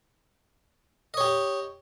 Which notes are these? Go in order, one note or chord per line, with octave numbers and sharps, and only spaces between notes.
G4 C#5 D#5